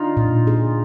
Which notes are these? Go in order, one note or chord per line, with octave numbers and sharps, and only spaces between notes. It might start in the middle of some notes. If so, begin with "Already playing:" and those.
Already playing: D4 D#4 F4
A#2
G#4